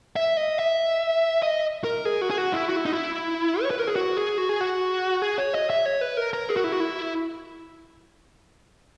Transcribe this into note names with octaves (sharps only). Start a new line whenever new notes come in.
E5
D#5
E5
D#5
A#4
G#4
F#4
G#4
F#4
E4
F#4
E4
D#4
E4
C#5
B4
A#4
G#4
F#4
G#4
F#4
G#4
F#4
G#4
C#5
D#5
E5
C#5
B4
A#4
A#4
G#4
F#4
E4
F#4
E4